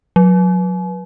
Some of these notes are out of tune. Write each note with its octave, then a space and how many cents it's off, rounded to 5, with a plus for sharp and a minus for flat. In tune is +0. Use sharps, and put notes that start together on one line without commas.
F#3 -25